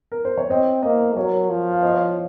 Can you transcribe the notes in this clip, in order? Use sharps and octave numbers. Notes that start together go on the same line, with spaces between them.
A#4
C5
C#5
C4 C5 D#5
A#3 C5 D#5
F#3 A#4 C#5
F3
F5
C5 D#5
C#5 F5